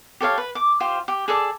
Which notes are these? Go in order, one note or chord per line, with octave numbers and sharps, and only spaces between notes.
G4 A4 C#5 F5
B4
D6
F4 G4 C5 F5
G4
G#4 A4 D5